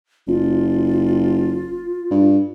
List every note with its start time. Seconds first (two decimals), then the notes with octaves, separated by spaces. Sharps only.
0.28 F#1 F4
2.11 G2